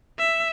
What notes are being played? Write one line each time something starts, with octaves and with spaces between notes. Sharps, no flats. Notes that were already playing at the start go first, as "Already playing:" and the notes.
E5